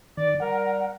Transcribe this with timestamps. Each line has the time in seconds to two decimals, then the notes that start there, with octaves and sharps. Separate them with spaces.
0.17 D#3 D5
0.40 G3 A#4 F#5